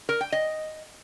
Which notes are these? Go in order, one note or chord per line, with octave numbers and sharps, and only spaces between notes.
A#4
G5
D#5